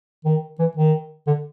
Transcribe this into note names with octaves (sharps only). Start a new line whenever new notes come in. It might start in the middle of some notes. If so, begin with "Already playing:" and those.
D#3
E3
D#3
D3